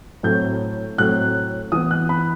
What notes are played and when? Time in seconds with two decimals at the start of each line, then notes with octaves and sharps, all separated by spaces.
0.23 A2 F#3 A3 C4 G6
0.98 A2 F#3 A3 C4 F#6
1.72 E3 B3 D#6
1.91 F#6
2.09 B5